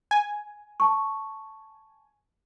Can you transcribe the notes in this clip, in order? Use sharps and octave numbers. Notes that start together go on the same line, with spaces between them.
G#5
A5 C#6